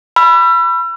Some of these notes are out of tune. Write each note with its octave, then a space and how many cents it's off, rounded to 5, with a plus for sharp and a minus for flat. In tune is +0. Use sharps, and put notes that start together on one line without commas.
B5 +0 E6 +40